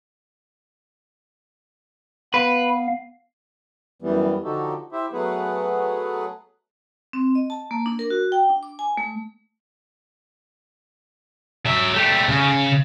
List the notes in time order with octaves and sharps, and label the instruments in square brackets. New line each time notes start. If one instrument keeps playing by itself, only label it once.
[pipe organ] B3 F5 [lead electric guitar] B4
[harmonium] F#2 E3 G3 B3
D3 F3 D#4 F#4 G4 A4
E4 G4 C5 E5
F#3 A3 B3 G#4 B4 F#5
[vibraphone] C4
D#5
A5
A#3
D4
A#4
F#4
G5
D4
D6
G#5
A3
[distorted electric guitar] F#3 E5
G3 A3
C#3